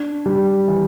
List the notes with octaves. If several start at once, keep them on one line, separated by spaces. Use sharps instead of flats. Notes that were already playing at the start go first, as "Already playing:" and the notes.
Already playing: D4
G3
E3